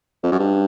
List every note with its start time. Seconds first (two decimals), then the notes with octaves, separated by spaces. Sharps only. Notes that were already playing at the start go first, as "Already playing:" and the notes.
0.23 F2
0.32 F#2
0.40 G2